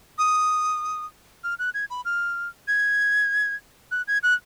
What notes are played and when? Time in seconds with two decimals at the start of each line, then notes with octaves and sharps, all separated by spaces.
0.18 D#6
1.44 F6
1.59 F#6
1.74 G#6
1.90 B5
2.05 F6
2.68 G#6
3.91 F#6
4.08 G#6
4.23 F#6